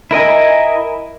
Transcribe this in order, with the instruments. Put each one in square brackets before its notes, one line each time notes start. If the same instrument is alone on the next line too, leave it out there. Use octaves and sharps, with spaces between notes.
[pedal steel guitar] E4 A#4 D#5 G#5